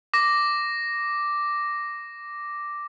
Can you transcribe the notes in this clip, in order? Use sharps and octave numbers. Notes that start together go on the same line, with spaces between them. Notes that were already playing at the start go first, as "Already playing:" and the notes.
D6 A#6